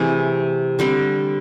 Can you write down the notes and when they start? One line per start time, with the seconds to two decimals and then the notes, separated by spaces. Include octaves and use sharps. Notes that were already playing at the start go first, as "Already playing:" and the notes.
Already playing: C3 E3 A3 G#4
0.79 D3 G3 C4